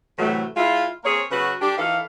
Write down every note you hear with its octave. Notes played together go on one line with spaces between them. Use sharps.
A2 C3 E3 F#3 A3
G#3 E4 F4
A#3 C4 G#4 C#5
C#3 F#3 F#4 B4
D4 G4
D#3 E3 A4 F5